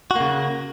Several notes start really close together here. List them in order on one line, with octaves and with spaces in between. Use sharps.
F#4 A#3 C#3